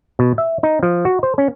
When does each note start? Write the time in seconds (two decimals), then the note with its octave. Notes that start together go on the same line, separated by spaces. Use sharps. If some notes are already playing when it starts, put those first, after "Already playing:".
0.19 B2
0.38 E5
0.63 D#4
0.83 F3
1.05 F#4
1.23 C5
1.38 C#4